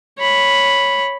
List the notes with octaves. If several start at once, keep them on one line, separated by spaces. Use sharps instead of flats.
C#5 B5